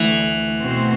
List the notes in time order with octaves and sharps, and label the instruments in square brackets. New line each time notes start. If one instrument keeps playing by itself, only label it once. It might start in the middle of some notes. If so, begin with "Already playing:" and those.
Already playing: [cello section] D2 D3 A3 [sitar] E3
[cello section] B2 A3 C4 F#4 C5